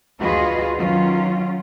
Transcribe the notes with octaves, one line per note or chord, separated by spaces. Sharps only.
D2 F4 F#4 G#4 B4 D#5
D#3 F#3 C#4 F4